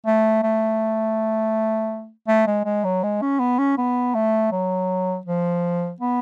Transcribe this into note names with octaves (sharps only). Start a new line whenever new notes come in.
A3
A3
A3
G#3
G#3
F#3
G#3
C#4
B3
C#4
B3
A3
F#3
F3
B3